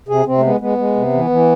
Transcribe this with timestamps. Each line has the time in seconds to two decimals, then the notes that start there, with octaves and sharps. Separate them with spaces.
0.09 C3 G#4
0.26 C3 C4
0.38 A3
0.43 G#3 B3
0.60 G#3 B3
0.78 G#3
0.96 C3
1.13 E3
1.30 E3